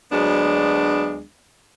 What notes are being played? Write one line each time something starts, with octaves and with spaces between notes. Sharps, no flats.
D2 F#3 G#3 B3 D4